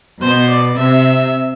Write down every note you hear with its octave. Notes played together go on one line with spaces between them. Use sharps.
B2 C5
D5
C3 E5